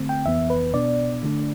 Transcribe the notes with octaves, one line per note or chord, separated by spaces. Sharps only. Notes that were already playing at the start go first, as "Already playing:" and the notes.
Already playing: D3 A3 C4
G5
F2 E3 B3 E5
B4
B2 B3 D4 D5
D3 A3 D4